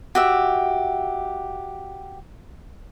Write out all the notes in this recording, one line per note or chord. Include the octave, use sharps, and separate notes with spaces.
F#4 G4 E5